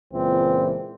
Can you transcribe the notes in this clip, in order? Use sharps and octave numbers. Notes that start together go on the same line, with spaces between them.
C#2 A#2 E3 C4